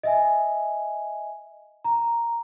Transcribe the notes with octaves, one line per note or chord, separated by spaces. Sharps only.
D#5 E5 G#5
A#5